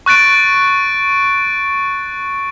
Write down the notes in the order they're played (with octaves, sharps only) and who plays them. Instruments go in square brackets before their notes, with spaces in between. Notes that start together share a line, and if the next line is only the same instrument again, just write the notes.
[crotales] C#6 F#6 A6 D7